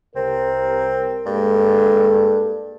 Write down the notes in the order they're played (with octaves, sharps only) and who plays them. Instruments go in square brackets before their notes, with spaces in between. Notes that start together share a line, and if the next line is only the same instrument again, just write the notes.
[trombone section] C2 C3 A#4 [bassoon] C4
[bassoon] G2 [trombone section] G#3 A#3 A4